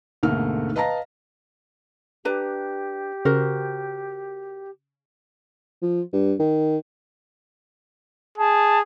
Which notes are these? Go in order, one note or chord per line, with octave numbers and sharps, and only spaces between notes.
D2 G#2 B2 A3 A#3 F6
B4 D#5 F5 A5 A#5 A#6
D4 G4 B4 A#5
C#3 F#4 A#4 C5
F3
G2
D#3
G#4 A5